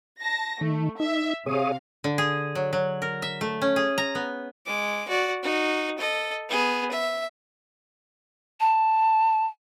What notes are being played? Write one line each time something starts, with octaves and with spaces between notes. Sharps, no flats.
A5 A#6
D#3 A3
D#4 E5
C3 G#4 C#5 F5 D#6
D3
G#4
F#3
F#3
A#4
E5
A3
C#4
G#4
A#5
B3
G#3 D6
F#4 D5
D#4 F#4
A4 D#5
B3 G#4
E5
A5